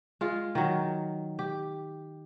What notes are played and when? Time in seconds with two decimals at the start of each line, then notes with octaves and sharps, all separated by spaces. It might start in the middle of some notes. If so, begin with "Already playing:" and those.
0.21 G#3 F4
0.55 D#3 F#3
1.39 G4